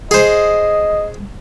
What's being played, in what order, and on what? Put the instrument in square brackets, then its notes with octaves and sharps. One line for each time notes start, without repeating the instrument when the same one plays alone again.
[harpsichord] G#4 C5 [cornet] D#5